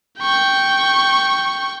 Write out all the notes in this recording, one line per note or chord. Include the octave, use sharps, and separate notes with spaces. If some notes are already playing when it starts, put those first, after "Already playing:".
G5 C#6